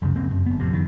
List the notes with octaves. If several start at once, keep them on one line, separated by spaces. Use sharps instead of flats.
F1 C#2 F#2 C#3
F1 C#3 A#3 C4
F#2
G1 B3
A1 F2 C3
F2 D#3